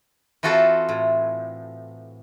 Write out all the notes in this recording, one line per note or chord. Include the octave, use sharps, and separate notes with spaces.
E3 C4 F4 F#4 A4
A2